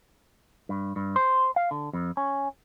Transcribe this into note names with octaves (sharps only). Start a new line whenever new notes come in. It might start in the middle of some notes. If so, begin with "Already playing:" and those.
G2
G2
C5
F5
D3
F2
C#4